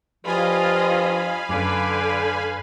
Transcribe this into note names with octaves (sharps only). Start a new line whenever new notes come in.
G2 F3 F4 D#5 F5 G#5 B5
F#2 D3 B4 D6